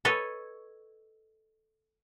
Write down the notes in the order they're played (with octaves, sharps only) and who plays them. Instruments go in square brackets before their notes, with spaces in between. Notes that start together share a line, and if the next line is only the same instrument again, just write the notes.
[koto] A4 B4 C#5 D#5